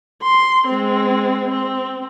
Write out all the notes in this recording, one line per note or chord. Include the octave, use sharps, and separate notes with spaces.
C6
G#3 C4
C4